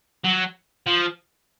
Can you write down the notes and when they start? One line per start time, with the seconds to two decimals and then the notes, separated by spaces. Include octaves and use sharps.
0.24 F#3
0.87 F3